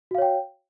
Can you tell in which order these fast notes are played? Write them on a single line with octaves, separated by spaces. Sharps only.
F#4 F5 C#5 G5